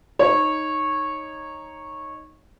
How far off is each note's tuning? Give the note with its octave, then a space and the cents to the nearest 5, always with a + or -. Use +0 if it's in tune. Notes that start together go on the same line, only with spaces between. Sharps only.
D#4 +0 C#5 -15